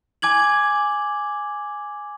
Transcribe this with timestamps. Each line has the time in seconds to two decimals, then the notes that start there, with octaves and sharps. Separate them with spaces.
0.22 G#5 D6 G#6 F#7